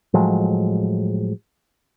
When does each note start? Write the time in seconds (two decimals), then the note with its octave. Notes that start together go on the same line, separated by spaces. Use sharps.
0.14 A2 F3 F#3 G#3